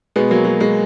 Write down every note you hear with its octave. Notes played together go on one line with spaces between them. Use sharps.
B2 G#3 B3
F#3 A#3
F#3
G#3